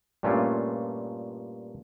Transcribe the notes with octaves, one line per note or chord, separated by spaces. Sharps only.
G2 A#2 A3 C#4 D4 F4